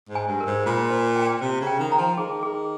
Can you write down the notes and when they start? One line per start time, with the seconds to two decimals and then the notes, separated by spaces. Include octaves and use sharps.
0.09 G#2
0.15 G#5
0.28 G2
0.40 A#4
0.46 G#2
0.66 A#2 F4
0.91 C5
1.16 G5
1.41 C3 C5
1.61 C#3
1.67 G5
1.79 D#3
1.92 A#5
1.98 F3
2.18 D#3 G#4
2.43 G#4